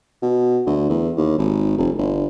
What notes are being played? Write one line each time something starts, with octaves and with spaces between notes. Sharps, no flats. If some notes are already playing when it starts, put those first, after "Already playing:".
B2
D2
E2
D#2
G#1
F1
G1